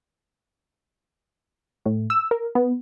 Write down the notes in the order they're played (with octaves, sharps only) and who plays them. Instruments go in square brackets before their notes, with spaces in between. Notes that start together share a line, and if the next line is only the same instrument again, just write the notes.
[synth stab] A2
E6
A#4
B3